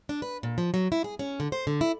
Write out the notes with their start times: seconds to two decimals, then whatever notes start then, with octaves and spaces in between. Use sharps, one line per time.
0.09 D4
0.22 B4
0.43 A#2
0.58 F3
0.74 F#3
0.92 E4
1.04 G#4
1.19 C#4
1.40 D3
1.52 C5
1.67 D3
1.81 E4